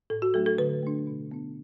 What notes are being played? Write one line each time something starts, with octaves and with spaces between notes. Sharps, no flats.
A2 A4
F#4
F#3 A3 D4 A4
A4
D3 B4
A3 D4
B2
B3 D4